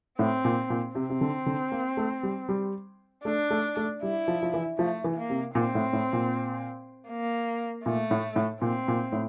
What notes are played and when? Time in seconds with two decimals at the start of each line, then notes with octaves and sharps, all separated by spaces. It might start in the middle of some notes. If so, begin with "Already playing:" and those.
0.19 A2 C4
0.45 A#2
0.70 A#2
0.95 C3 C4
1.10 C3
1.21 D3
1.46 D3
1.72 A#3
1.97 A3
2.23 G3
2.49 G3
3.25 A3 D4
3.50 A3
3.77 A3
4.03 G3 E4
4.28 F3
4.43 F3
4.54 E3
4.78 F3 A3
5.04 E3
5.17 A#3
5.30 C3
5.55 A#2 C4
5.75 A2
5.93 A2
6.13 A#2
7.09 A#3
7.85 A#2 A3
8.11 A2
8.36 A2
8.61 A#2 C4
8.88 A#2
9.12 A2